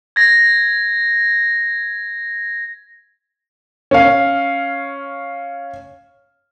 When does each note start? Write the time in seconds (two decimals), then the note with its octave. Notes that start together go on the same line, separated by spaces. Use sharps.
0.16 G#6 A#6
3.91 C#4 F5